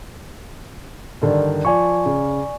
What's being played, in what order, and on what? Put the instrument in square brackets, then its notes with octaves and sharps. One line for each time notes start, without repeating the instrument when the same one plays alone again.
[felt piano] G2 D3 D#3
[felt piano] F3 [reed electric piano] D5 G#5 C#6
[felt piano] C#3